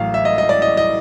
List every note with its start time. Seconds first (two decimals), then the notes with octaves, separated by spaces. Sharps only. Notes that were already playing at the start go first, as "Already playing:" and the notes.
Already playing: A1 A2 F#3 F5
0.14 E5
0.25 D#5
0.38 D#5
0.49 D5
0.62 D#5
0.77 D#5